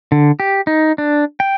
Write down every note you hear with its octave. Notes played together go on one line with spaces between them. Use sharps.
D3
G4
D#4
D4
G5